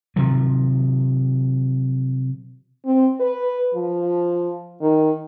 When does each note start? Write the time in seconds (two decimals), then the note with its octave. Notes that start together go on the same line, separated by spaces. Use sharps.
0.16 C3 D#3 F3 F#3
2.85 C4
3.20 B4
3.75 F3
4.81 D#3